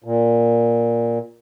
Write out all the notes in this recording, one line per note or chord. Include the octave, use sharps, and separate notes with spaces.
A#2